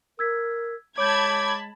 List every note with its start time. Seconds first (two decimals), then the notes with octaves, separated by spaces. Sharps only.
0.19 A#4 E6 G#6 B6
0.98 G#3 C#5 A5 B5 D6 G6 G#6